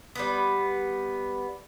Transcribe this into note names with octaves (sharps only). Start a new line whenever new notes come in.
G3 B3